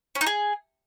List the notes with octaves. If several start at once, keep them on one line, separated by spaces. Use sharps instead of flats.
C#4
D#4
G#4